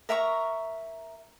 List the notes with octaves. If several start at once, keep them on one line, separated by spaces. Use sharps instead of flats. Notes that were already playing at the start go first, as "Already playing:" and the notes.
A#4 E5 A#5 C#6